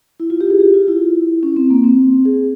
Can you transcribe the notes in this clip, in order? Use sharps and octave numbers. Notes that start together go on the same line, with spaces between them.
E4
F4
G4
G#4
G4
F4
E4
C#4
C4
A#3
C4
G#4